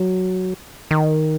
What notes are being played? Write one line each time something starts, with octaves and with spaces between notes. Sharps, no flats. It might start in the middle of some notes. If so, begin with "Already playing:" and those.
Already playing: F#3
D#3